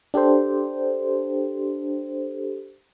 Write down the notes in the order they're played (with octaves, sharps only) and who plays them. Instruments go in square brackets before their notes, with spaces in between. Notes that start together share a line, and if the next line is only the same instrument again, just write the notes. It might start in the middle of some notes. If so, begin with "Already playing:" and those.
[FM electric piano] D4 G4 A4 C5